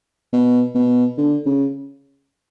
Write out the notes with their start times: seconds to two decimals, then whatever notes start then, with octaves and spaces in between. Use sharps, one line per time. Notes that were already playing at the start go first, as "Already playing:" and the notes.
0.33 B2
0.75 B2
1.18 D3
1.46 C#3